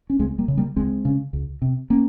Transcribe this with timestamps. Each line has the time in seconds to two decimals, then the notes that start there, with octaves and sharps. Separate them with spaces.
0.10 C#4
0.19 C#2 G#3 C4
0.38 G3 A#3
0.48 C#3
0.57 G3 A#3
0.76 C#2 G#3 C4
1.05 C#3
1.33 C#2
1.62 C3
1.90 A#3 C#4